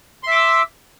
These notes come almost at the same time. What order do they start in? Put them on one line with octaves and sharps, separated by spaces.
C6 E5 D6 E6